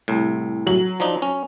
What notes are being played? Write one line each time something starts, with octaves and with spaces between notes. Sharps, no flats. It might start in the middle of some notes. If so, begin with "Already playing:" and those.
C2 A2
F#3 F#7
F3 D4 D#4
C#4